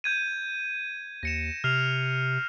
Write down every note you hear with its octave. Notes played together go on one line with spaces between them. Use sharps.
G6 G#6 D#7
D#2 A#6 C#7 E7
C3 F6 C7 F7